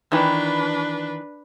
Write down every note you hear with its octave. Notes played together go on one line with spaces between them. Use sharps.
D#3 E3 D4 B4